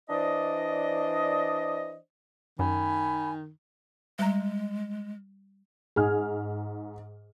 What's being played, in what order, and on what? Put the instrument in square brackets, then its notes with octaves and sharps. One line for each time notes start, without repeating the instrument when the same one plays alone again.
[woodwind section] E3 D4 C5 D5 D#5
[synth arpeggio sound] F#2 [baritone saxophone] D#3 [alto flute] G#5 [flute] B5
[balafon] G3 A#5 [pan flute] G#3
[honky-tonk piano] G#2 D#4 F6 [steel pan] G#4